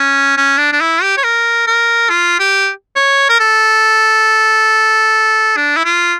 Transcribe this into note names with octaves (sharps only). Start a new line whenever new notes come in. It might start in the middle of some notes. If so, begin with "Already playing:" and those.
Already playing: C#4
C#4
D4
D4
E4
G4
C#5
A#4
A#4
F4
G4
C#5
A#4
A4
D4
E4
F4